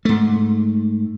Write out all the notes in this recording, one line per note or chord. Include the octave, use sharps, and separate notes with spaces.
G#2 A3